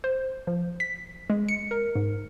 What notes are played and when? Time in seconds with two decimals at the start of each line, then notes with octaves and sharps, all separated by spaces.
0.04 C5
0.47 F3
0.80 B6
1.30 G#3
1.49 C#7
1.71 A#4
1.95 G#2